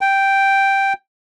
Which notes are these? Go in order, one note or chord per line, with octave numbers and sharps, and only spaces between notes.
G5